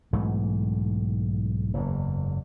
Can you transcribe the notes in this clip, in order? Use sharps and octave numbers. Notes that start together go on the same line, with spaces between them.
B1 G#2 E3 A3
F#1 E2 G#2